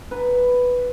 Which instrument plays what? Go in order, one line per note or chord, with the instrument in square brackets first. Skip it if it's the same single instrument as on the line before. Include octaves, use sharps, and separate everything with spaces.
[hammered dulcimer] B4